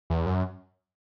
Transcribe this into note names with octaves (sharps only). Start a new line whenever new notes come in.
E2
F#2